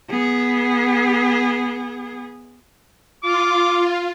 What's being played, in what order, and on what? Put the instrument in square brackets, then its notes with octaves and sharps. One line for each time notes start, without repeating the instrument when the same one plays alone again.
[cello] B3 G#4
[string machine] F4 [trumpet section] D6